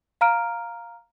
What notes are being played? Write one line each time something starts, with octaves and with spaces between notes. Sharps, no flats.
F5 A#5 F6 D7